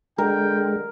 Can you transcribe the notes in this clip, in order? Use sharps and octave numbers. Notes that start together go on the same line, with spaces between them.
D3 G#3 A#4 G5